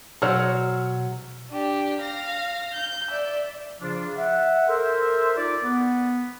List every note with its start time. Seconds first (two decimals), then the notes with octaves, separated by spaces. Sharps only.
0.22 B2 F#3 C5 C#5 F#5 E6 F6
1.51 D4 G4
2.01 F5 A#6
2.74 G6
3.08 D5 E5
3.81 C#3 F3 D4 F4
4.16 E5 F#5
4.68 A4 A#4 C5 E5
5.37 D#4 F4 D5
5.64 B3